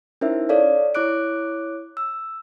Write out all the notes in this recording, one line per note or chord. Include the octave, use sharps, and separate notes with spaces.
C#4 D#4 E4 A#4 C5 E5
A4 C#5 D5 F5
E4 C#5 D6 F#6 D7
E6